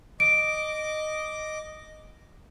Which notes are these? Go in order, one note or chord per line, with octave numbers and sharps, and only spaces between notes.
D#5 D6 D7